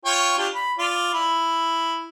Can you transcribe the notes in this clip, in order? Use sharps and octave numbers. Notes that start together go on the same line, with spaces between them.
F4 C#5 G5
D4 F4 G4
B5
F4 D5
E4